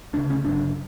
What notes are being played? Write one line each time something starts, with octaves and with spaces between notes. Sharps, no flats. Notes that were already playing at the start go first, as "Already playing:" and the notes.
D2 C#3 D4
C#4
G1 F#2 C#3 D4